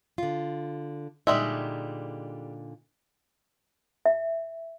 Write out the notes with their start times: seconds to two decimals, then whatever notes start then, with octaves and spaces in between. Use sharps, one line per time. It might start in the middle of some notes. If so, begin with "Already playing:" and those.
0.18 D3 F4
1.27 A#2 D3 G3 G#3 D#4 E5
4.06 E5